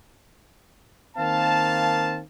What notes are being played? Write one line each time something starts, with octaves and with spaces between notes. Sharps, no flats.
D#3 A#3 C4 F5 A5